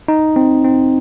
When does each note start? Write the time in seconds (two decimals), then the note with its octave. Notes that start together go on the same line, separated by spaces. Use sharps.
0.08 D#4
0.36 C4
0.64 C4